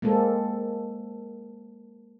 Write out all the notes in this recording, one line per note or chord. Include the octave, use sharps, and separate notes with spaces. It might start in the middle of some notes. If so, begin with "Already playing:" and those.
G#3 A#3 C4 A4